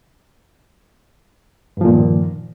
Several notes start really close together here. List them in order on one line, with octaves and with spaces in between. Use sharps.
G2 F3 A#2 D#3